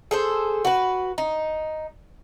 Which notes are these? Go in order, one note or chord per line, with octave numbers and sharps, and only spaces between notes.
G#4 A4 C5
F#4 B4
D#4